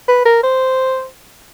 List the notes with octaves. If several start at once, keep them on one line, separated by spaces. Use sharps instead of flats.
B4
A#4
C5